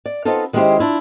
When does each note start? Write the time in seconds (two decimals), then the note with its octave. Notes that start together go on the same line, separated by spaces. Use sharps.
0.06 D5
0.25 B3 C4 D#4 F4 A4
0.53 D#3 G#3 C#4 E4 G4 C5
0.79 D4 E4 F4